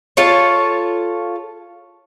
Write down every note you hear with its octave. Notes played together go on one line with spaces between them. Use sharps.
F4 A4 C#5